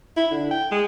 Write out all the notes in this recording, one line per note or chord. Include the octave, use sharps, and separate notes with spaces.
E4
D3
G5
G#3